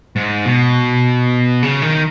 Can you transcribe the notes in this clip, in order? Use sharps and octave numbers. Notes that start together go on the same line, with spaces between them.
G#2
B2
C#3
D#3